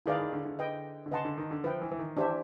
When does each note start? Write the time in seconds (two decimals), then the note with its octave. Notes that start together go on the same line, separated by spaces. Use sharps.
0.06 D#3 E4 G#4 B4 D5 F5
0.19 D#3
0.33 D3
0.45 D3
0.59 B4 D#5 G5
1.06 D3
1.11 C#3 B4 D#5 F#5 A5 C6
1.25 D3
1.38 D#3
1.51 D3
1.64 F3 B4 E5 G5
1.81 E3
1.92 E3
1.99 D#3
2.17 E3 D4 G4 C5 E5